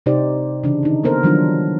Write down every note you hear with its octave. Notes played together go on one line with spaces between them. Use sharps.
C3 D#4 G4 C5 D5
C#3 E3 D4
D#3 D#4
A#3 B3 A4 A#4 C5
D#3 E3 F#3 G3 D4 F4